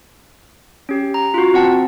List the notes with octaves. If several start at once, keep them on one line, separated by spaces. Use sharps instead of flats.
C#4 G4
A#5
F4 F#4
C4 F#5 A5